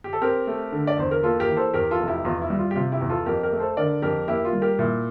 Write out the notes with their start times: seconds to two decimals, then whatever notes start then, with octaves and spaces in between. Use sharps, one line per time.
0.04 G4
0.13 A4
0.22 C4 G4 A#4
0.47 A3
0.72 D3
0.87 D5
0.98 E2 C5
1.11 A#4
1.23 A#3 F4 A4
1.40 G4 A#4
1.48 E3
1.57 A4 C5
1.74 E2 G4 A#4
1.91 F4 A4
1.99 F1
2.08 E4 G4
2.25 E2 F4
2.42 E4
2.50 G3
2.59 F4
2.71 G4
2.76 C3 F4
2.92 E4 G4
3.01 E2
3.09 F4 A4
3.26 F2 G4 A#4
3.43 G4 A#4
3.52 A3
3.60 A4 C5
3.77 D3 A#4 D5
4.02 F2 G4 A#4
4.28 A#3 E4 G4
4.45 F4
4.53 G3
4.62 G4 A#4
4.79 A#2 E4